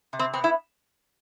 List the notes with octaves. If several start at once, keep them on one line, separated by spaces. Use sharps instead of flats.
C3
C4
B3 C4
E4